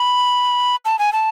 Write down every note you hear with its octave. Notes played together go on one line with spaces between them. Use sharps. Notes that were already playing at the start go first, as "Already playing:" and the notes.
Already playing: B5
A5
G#5
A5